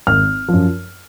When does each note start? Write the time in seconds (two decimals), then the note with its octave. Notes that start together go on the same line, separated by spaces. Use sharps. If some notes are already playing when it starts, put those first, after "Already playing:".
0.07 G#1 F6
0.48 F#2 F3